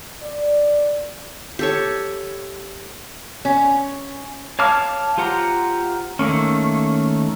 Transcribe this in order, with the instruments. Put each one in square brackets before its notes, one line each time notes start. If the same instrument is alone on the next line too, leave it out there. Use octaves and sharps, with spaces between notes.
[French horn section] D5
[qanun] G4 A4 C#5
[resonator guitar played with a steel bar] C#4
[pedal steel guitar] C#5 F5 A5 D6 F6
F4 G4 C5 F#5 A#5
D#3 A3 A#3 C#4